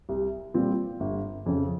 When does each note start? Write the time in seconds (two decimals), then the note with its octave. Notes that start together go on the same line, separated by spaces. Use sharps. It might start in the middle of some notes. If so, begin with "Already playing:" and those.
0.09 C2
0.54 A#2 G3 C4 F4
1.00 G1
1.46 F2 C#3